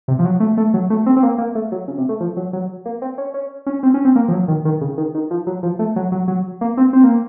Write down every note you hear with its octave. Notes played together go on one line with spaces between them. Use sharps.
C3
F3
F#3
A3
A3
F#3
A3
C4
C4
A#3
A#3
A3
F#3
C#3
C3
A3
F3
F#3
F#3
A#3
C4
C#4
C#4
C#4
C4
C#4
C4
A#3
F3
F#3
D#3
D#3
C#3
D#3
D#3
F3
F#3
F3
A3
F#3
F#3
F#3
A#3
C4
C4
A#3